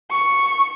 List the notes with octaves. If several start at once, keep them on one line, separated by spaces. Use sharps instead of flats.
C#6